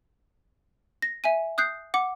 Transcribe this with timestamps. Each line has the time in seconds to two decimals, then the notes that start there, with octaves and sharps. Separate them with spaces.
1.02 A#6
1.24 E5 G#5 D#7
1.58 D#6 F#6 G6 C7
1.94 F#5 D6